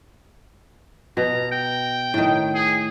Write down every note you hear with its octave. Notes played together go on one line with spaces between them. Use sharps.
B2 A#5
G5
A2 D#3
G#4